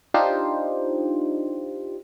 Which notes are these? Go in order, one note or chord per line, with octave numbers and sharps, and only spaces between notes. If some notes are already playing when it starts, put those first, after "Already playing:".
D4 D#4 F4 G4 C5